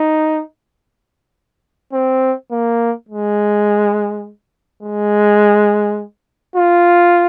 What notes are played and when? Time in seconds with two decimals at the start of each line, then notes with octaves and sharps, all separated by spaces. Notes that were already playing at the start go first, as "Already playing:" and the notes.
Already playing: D#4
1.93 C4
2.51 A#3
3.09 G#3
4.83 G#3
6.56 F4